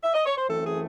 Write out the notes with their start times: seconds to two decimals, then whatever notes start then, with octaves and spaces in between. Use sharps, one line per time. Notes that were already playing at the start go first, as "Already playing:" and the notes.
0.03 E5
0.14 D#5
0.25 C#5
0.37 C5
0.48 F#2 E3 A3 C4 A4
0.65 G#4